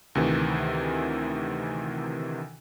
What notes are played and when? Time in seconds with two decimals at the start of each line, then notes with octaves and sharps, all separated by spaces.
0.15 D2 C3 D#3 E3